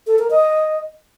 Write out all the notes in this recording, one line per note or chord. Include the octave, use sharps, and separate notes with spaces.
A4
A#4
D#5